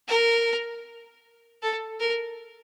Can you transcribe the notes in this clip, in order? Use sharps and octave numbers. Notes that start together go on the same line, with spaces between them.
A#4
A4
A#4